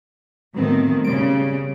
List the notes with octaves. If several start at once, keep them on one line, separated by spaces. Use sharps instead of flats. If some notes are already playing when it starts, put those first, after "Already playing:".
A2 D#3 F3 F#3 B3 C4
C#3 G3 D7